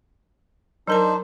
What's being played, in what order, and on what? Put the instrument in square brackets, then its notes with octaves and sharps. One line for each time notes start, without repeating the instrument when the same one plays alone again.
[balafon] F#3 A#4 A#5 [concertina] D4 D#4 C5